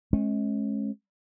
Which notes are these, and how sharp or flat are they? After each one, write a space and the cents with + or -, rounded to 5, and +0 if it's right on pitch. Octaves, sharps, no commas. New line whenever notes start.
G#3 +35 C#4 -30